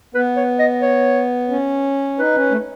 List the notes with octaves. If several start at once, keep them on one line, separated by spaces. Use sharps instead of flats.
B3 B4
C#5
D#5
C#5
C#4
D#4 B4
C#4
A3